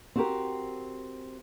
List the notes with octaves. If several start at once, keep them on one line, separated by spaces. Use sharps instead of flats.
C4 F#4 G4 A#4